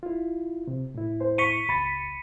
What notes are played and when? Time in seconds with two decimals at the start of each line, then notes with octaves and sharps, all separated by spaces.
0.03 E4 F4
0.67 C3
0.95 A2 E4
1.20 C5
1.38 C#6 B6 C#7 D#7
1.69 C#2 B5 A6